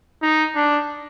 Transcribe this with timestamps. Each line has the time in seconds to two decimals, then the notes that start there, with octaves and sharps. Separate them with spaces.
0.22 D#4
0.55 D4